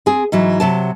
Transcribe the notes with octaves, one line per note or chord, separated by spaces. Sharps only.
C4 G#4
G#2 E3 F#3
C3 F#3 A5